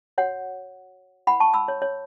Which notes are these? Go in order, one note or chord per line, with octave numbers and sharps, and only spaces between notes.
F#4 C#5 F#5
E4 B4 F#5 B5
A5 C#6
B5 E6
C#5
C#5